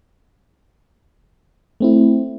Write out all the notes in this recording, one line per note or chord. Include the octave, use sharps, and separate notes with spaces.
A3 C4 E4